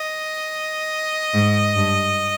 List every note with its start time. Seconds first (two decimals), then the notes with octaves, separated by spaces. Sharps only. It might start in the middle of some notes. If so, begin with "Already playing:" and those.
Already playing: D#5
1.34 G#2
1.76 G2